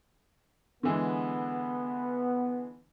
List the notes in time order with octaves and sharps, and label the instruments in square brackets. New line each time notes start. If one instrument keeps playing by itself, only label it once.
[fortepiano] D3 E3 G#3 [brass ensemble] B3